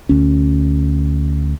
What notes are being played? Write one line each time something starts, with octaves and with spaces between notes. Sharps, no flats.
D2 C#4